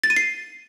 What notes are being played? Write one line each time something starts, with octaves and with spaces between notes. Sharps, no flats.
A6
D#7
C7